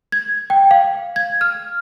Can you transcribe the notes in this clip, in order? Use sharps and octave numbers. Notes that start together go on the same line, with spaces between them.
G#6
G5
F5
G#6
F6